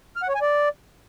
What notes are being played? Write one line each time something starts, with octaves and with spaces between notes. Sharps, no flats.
F6
F#5
C#5
G#5
D5